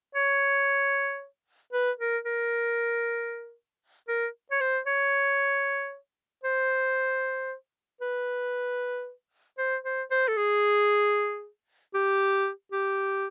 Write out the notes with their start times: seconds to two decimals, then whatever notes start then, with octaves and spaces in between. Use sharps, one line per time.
0.15 C#5
1.73 B4
1.99 A#4
2.25 A#4
4.09 A#4
4.51 C#5
4.61 C5
4.87 C#5
6.44 C5
8.01 B4
9.58 C5
9.84 C5
10.11 C5
10.28 A4
10.37 G#4
11.94 G4
12.72 G4